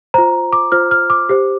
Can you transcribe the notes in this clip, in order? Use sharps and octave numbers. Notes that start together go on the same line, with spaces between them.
F4 C5 A#5
D6
F4 C5 F6
F6
D6
G4 C5